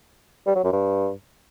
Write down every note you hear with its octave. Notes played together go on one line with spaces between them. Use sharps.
G3
F#3
F#2
G2